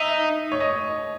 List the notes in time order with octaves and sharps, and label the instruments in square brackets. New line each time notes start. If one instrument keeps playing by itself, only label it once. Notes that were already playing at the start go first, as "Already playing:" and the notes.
Already playing: [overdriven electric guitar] D#4 [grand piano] E5
[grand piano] C#5
D#5